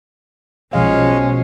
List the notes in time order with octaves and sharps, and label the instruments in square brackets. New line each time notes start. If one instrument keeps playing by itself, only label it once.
[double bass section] B1 [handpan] B2 F3 F5 [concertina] G#3 [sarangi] C#4